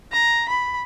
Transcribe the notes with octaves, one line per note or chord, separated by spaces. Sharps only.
A#5
B5